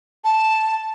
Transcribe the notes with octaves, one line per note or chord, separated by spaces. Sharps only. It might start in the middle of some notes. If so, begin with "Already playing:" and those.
A5